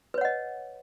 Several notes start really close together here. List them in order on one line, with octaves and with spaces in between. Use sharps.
B4 C#5 F#5 D#5